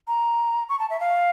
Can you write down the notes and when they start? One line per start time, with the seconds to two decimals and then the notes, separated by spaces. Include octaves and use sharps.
0.07 A#5
0.69 C#6
0.79 A5
0.90 E5
1.00 F5